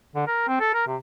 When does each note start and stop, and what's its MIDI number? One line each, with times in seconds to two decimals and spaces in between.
0.16 0.26 50
0.27 0.43 70
0.48 0.59 60
0.60 0.74 69
0.74 0.85 70
0.87 0.96 48